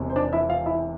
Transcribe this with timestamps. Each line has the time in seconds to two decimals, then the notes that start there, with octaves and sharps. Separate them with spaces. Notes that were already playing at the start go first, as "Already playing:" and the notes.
Already playing: E1 E2 C3
0.10 C5
0.16 D4 D5
0.33 E4 E5
0.49 F4 F5
0.66 E4 E5